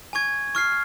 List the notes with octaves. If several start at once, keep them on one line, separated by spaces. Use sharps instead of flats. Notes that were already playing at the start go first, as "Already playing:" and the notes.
G#5 C#6 G#6
C#6 F6 C7